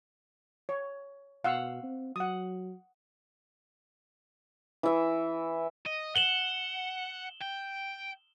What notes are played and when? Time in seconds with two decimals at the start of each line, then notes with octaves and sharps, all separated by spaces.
0.69 C#5
1.44 B2 F5 F#5 E6
1.83 C4
2.16 F#3 F#5 D#6
4.83 E3 E5
5.87 D#5
6.16 F#5 E7 F#7 G7
7.41 G5